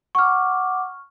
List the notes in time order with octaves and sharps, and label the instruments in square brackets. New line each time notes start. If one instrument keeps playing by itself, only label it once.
[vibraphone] F#5 D6 [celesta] C#6 F6